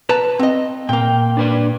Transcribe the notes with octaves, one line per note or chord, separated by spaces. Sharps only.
B4 A5 A#5
C4 D#5
A#2 A#3 G5
D4 B4 D5